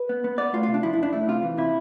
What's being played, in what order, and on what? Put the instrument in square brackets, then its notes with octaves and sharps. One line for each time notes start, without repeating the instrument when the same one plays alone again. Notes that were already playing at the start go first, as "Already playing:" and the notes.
Already playing: [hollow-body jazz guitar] B4
B3
B3
B3 D5
A3 F4
C3 F4
D4
F3 E4
E4
F2 D4
A3 E4
C3 F4
E3
C3 E4